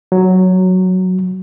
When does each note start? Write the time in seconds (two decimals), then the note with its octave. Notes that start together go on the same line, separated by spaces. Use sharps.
0.12 F#3